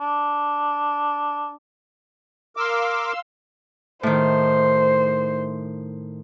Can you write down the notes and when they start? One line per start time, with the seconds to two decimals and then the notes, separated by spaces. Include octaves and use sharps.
0.01 D4
2.57 A#4 F5 C6 D6 E6
4.03 A2 D#3 C5